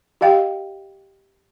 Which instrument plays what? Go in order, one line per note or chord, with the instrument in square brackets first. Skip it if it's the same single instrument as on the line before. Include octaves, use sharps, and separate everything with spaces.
[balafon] G4 D#5 F5 G5